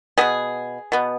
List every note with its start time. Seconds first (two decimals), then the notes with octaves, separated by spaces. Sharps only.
0.18 B2 G3 B3 G#4
0.92 B2 B3